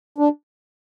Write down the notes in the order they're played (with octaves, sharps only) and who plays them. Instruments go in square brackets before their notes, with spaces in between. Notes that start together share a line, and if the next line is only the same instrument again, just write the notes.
[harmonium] D4